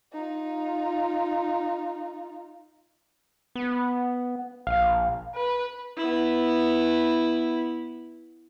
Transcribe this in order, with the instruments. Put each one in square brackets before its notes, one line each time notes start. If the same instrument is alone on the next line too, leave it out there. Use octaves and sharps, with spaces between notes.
[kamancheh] D#4 F4
[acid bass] B3
[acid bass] A#1 [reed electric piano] F5
[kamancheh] B4
[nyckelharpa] B3 E4